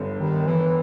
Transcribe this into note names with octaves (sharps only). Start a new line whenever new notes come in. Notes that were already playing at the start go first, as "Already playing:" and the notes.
Already playing: G1 G2 B3
D#3 G3
E3 B3